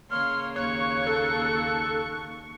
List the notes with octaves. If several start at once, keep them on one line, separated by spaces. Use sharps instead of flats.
C#3 A#3 C#5 C6 F6
D#2 C#5 C#6 F#6
A4